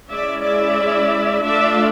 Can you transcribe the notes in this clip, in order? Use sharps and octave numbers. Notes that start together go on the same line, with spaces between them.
G#3 C#4 E4 D5 E5
D5 E5
A3 D4 F4 D5 E5